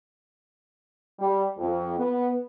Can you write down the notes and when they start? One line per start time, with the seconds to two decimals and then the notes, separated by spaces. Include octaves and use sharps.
1.19 G3
1.58 F2
1.98 B3